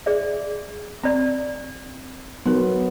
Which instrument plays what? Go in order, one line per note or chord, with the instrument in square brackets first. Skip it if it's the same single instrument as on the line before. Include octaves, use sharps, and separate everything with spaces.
[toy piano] G#4 D5 E5
[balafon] C4 [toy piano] D5 B5
[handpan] F#3 B3 [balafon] D#4 A#4